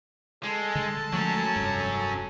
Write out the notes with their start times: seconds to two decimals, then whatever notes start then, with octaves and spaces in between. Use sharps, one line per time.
0.44 G#3 A4
0.75 D3
1.13 F3 F#3 G#3 A3 C#4
1.56 F1 G2